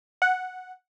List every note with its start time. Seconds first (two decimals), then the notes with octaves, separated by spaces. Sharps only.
0.22 F#5